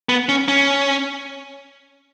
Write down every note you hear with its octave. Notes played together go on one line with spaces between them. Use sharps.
B3
C#4
C#4